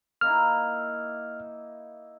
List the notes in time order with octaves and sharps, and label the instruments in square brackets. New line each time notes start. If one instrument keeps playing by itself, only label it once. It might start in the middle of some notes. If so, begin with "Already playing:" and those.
[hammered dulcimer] A#3 D#4 E4 [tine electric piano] F6